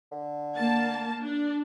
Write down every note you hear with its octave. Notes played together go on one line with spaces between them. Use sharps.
D3
A#3 A5
D4